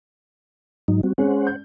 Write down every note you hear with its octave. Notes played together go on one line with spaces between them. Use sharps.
G#2 F#3 D#4
G3 C4 F#4
G#3 C#4 C5 F#5
G6